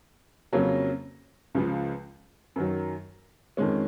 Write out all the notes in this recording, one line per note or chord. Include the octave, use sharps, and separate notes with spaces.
F2 C#3 F#3 A#3 C#4
C#2 C#3 F3 G#3
F#2 D#3 F#3
F2 D#3 G#3 C#4